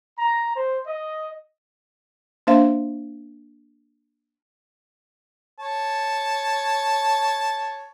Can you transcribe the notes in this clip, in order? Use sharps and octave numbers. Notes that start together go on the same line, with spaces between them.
A#5
C5
D#5
A#3 D4 C5 E5 F5
C#5 A5